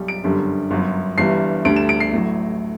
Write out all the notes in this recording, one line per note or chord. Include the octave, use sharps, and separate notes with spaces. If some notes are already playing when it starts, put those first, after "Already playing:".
Already playing: B1 G3
D7
G1 F#2 D3 G3
G1 F#2 F#3
G1 G2 E3 G3 C7
D2 D3 G3 D7
E7
D7
C7
A1 A2 F#3